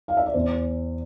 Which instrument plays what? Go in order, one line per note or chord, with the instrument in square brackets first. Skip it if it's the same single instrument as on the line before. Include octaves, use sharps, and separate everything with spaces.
[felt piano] F5
E5
D5
E2 C5